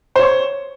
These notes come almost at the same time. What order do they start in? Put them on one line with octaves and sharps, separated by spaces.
C5 C#5 C#6